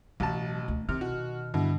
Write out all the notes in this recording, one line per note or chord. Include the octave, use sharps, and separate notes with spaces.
A1 B2 E3 F#3 A5
D2
C3 D#3 F6
B2 F#4
G2 B2 D3 E4